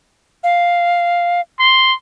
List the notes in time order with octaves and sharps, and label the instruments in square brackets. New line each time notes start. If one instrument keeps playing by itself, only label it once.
[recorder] F5
[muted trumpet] C6